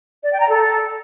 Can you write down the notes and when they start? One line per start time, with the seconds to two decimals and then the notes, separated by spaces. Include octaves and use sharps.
0.23 D5
0.32 G5
0.40 A#5
0.49 A4